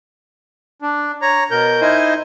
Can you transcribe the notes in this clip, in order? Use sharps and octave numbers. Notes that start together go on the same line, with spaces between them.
D4
C#5 A#5
B2 A#4 G6
D#4 E4 C5 D#5 G#5